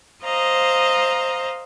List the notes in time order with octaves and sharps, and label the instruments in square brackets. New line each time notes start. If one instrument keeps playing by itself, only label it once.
[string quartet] C5 D#5 F5 A#5